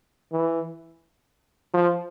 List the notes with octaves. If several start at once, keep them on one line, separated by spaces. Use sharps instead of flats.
E3
F3